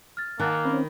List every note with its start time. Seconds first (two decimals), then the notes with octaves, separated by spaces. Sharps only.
0.17 F6 A6
0.39 D#3 A#3 F#5 G#5 A5 F#6
0.65 C4 C#4 B5